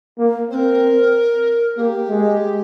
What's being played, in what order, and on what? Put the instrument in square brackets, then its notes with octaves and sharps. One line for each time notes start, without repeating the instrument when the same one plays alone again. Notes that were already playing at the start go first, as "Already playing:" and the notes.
[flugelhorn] A#3
[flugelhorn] C4 [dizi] C5
[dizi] A#4
[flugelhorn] A#3 [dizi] G#4
[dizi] G4
[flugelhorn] G#3